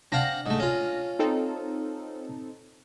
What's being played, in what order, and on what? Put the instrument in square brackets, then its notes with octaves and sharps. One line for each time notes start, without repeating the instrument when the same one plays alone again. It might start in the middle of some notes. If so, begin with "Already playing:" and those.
[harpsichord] C4 F5 F#5 [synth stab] D4 A#6
[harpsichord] G#2 A3
C#4 F4
[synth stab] C4 D#4 A4